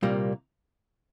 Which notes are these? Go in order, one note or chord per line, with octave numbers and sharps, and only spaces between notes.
C2 A#2 G3 A#3